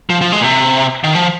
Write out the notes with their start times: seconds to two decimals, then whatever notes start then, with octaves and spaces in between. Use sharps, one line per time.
0.10 F3
0.21 F3
0.32 G#3
0.41 A#2
0.44 C3
1.04 D#3
1.15 F3